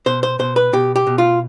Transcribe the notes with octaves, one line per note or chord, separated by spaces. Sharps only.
B2 C5
C5
B2 C5
B4
B2 G4
G4
B2
F4